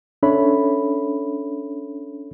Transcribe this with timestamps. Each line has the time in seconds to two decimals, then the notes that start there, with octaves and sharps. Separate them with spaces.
0.23 C#4 D4 A4 C#5 E5 B5